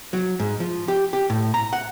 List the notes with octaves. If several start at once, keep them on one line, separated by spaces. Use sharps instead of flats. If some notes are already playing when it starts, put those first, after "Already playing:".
F#3
G#2
F3
G4
G4
A2
A#5
F#5